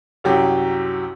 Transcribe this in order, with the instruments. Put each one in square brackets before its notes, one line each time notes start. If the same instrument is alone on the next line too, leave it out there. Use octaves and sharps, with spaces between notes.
[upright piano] C2 F#2 F#3 G4